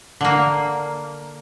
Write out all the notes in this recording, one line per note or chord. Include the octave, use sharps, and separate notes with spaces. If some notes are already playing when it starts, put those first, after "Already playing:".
D3 A#3